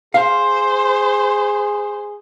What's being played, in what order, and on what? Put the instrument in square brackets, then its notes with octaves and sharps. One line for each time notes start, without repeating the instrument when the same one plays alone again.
[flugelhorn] G#4 [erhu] C5 [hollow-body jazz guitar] F5